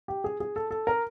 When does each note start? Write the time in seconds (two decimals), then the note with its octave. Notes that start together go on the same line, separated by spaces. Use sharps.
0.08 G4
0.24 G#4
0.40 G#4
0.56 A4
0.71 A4
0.87 A#4